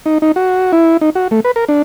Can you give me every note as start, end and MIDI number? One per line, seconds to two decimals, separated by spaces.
0.06 0.18 63
0.22 0.32 63
0.36 0.72 66
0.72 0.97 64
1.01 1.10 63
1.15 1.28 66
1.31 1.40 57
1.45 1.51 71
1.56 1.65 70
1.69 1.82 62